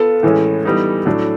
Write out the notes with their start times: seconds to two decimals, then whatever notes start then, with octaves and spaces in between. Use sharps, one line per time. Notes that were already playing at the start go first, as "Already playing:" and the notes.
Already playing: B3 F4 A4
0.23 A2 E3 G#3 C#4
0.65 E3 G3 B3 D#4
1.06 A2 F#3 A3 D4